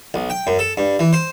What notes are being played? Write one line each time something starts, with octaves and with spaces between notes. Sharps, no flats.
B1
G5
F#2
A4
G2
E3
C5